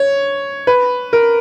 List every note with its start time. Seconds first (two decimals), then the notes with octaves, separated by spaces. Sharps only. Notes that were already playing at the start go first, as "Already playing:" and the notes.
Already playing: C#5
0.67 B4
1.13 A#4